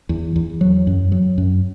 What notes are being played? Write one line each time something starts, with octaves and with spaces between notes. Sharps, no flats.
E2
E2
F#3
F#2
F#3
F#2